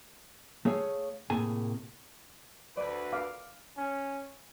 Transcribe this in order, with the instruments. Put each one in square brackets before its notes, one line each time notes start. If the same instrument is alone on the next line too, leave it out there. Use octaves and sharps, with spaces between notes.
[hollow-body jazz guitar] A3 G#4 C#5 F5
A2 C3 A#3 G#4 G#5
[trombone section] D2 B4 [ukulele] D5
[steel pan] F5 D6
[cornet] C#4